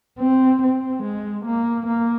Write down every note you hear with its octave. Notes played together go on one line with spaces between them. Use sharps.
C4
C4
G#3
A#3
A#3